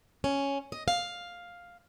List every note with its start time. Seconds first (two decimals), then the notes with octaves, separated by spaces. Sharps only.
0.24 C#4
0.72 D#5
0.88 F5